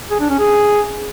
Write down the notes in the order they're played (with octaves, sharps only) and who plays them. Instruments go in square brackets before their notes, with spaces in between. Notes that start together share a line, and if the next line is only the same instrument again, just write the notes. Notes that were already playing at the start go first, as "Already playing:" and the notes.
[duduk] G#4
D4
C#4
G#4